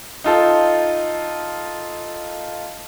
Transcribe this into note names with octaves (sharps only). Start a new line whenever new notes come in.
D#4 F4 A4